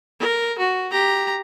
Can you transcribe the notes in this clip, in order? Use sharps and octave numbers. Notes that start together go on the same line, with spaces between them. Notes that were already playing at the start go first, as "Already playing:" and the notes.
A#4
F#4
G4 A#5